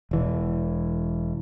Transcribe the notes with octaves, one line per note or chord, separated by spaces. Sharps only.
E1 E3